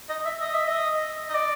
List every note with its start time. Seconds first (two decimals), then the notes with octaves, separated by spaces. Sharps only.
0.09 D#5
0.25 E5
0.40 D#5
0.54 E5
0.68 D#5
1.29 D#5
1.34 D5